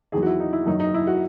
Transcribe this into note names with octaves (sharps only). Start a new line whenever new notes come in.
E2 D#3 F#3 G#4
F#4
E4
D#4
E4
F#2 D#3 F#3 D#4
D#4
E4
F#4